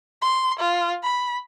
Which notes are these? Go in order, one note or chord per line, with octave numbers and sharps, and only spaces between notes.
C6
F4
B5